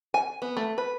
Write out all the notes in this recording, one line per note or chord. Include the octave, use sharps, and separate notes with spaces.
G#5
B3
A3
B4